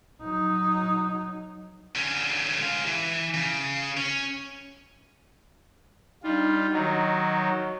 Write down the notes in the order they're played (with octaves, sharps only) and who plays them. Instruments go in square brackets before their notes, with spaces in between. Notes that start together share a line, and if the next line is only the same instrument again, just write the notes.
[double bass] F#3 D#4
[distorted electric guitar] D3 C#4
G#3 F5
E3
C#3
C#4
[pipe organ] G3 F4 [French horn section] D4 D#4
[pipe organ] D#3 F#3 [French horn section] C#5 D#5